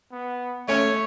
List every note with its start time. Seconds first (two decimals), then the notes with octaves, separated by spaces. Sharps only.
0.12 B3
0.68 A3 C#4 C#5